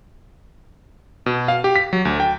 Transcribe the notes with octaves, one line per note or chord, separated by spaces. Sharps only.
B2
F5
G4
B6
F#3
D2
G5